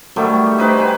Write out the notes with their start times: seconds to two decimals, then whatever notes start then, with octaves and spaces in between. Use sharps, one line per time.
0.16 D#3 F#3 G3 A3
0.46 G4
0.58 D#4 B4 C5 G5
0.79 D#4 B4 G#5